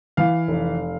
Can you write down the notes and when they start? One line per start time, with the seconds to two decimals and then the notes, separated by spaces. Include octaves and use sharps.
0.17 E3 F5
0.48 F1